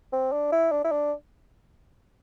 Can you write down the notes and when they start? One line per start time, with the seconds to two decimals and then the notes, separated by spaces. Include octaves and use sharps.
0.12 C4
0.32 D4
0.52 E4
0.71 D4
0.84 E4
0.91 D4